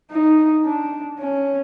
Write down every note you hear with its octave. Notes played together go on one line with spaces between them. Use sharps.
D#4
D4
C#4